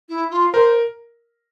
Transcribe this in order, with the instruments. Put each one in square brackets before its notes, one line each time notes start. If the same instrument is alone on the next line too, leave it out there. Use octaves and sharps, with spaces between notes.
[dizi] E4
F4
[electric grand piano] A#4 [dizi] C5